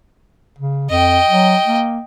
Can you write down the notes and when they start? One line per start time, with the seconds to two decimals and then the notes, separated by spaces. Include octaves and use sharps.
0.59 C#3
0.90 F2 D#5 G5
1.28 F#3
1.67 A#3